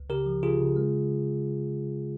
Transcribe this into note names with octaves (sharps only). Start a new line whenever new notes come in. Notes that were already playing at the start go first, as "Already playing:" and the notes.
Already playing: C#2
C#3 G4 A#4
F3
C#3 F4 G#4
C#3
G#3